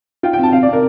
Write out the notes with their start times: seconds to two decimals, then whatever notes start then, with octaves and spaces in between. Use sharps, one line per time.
0.23 F4 G5
0.33 C4 G5
0.43 A5
0.52 C3 F5
0.63 C3 D5
0.73 A#4